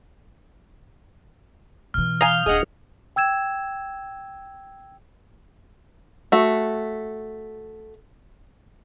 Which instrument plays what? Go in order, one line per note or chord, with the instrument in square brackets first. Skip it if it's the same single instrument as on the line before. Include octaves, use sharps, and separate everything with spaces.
[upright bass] B2 E3 [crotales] F6
[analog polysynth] F5 G6 [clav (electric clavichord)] G#5 A#5 [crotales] D#6 F7
[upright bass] D#1 D4 [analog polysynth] G#4 D#5 F#5
[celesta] G5 E6 G#6 E7
[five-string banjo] A3 F#4